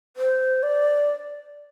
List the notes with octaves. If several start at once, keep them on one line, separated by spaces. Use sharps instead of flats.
C5
D5